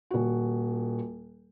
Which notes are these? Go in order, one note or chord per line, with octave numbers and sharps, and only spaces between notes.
D#1 F#4